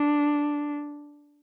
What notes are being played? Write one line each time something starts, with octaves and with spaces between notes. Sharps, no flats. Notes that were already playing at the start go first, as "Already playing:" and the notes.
Already playing: D4